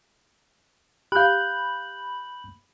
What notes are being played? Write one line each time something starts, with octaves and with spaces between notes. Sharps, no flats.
G4 F5 B5 F#6 G6